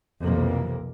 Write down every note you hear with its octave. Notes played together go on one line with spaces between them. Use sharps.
B1 F2 C3 E3 A#3